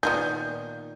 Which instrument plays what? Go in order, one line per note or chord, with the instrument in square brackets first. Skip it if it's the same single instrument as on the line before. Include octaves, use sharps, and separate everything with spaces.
[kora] A#2 D#3 [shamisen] B3 F4 G#4 [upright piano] G6